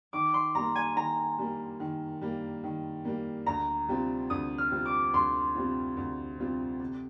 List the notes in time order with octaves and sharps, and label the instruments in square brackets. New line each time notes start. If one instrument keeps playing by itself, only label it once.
[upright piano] D#3 [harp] D6
[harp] C6
[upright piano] G3 A#3 [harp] A#5
[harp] G#5
[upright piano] D#3 [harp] A#5
[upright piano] G3 A#3
D#3
G3 A#3
D#3
G3 A#3
[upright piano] D2 [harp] A#5
[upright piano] C3 G3 C4 F4
[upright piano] D2 [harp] D#6
[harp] F6
[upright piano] C3 G3 C4 F4
[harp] D6
[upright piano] D2 [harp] C6
[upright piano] C3 G3 C4 F4
D2
C3 G3 C4 F4
C3